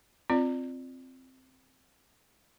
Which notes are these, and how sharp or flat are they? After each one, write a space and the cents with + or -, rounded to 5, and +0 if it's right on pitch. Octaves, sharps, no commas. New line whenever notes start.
C4 +0 F4 -10 D5 +20